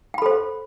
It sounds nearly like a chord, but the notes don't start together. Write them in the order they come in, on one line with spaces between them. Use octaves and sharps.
G5 B5 A4 C5